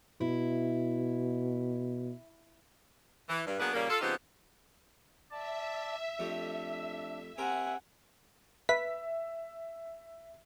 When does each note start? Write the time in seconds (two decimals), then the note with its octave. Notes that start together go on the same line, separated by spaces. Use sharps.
0.21 B2 E4
3.29 E3
3.47 G2
3.59 F#3 A#3 B3 D4 G#4 B4
3.74 A#2 C#3 G3 A#3
3.90 F4 A4
4.01 C#3 F3 B3 C4 D#4 G4
5.31 D5 E5 A5
6.19 F2 A3 D4 G4
7.38 C4 G4 A#4 E5 F#5 G#5
8.69 B4 E5 B6